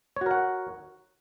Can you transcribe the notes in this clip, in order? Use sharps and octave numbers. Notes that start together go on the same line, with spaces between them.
F#4 A#4 C#5 F#5